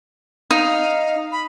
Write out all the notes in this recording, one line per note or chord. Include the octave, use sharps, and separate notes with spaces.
D#4 F5
B5